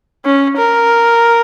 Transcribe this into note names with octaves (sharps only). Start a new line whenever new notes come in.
C#4
A#4